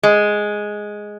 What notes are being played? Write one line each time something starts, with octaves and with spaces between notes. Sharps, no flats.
G#3